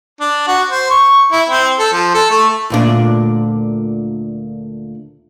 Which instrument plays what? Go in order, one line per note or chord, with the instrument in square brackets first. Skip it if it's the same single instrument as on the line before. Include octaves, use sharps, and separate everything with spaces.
[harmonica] D4
F#4
C5
C#6
E4
C4
A4
F3
A4
A3
[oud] D2 A#2 D4